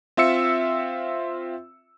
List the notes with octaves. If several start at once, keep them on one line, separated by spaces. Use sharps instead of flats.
C4 F4 E5 E6 C#7